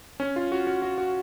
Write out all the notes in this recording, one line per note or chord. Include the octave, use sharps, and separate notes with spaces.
C#4
F4
F#4
F#4
F#4
F#4